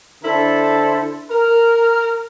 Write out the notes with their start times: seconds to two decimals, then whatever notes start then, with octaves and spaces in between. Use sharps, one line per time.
0.23 D3 D4 E4 A4 C5
1.30 A#4